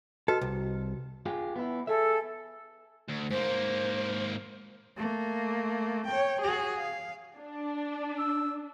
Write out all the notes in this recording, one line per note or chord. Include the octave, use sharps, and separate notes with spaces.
F#4 A4 B4 D#5
C2
F4 G4 G#4
B3 E4
G#4 A4 E5
D2
G#2 A#3 C5
A3 A#3
C#5 G5
F#4 G#4
F5
D4
E6